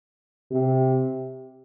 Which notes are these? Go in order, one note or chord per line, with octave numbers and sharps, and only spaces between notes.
C3